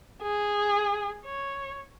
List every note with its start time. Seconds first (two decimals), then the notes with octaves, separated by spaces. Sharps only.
0.23 G#4
1.25 C#5